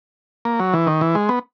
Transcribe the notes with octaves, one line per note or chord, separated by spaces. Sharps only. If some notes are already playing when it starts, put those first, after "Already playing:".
A#3
F#3
E3
D#3
E3
G#3
B3